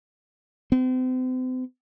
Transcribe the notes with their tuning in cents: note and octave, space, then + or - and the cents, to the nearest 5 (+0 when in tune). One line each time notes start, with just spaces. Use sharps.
C4 -40